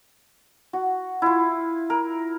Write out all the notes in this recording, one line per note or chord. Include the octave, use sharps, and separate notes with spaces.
F#4
E4 F4
A#4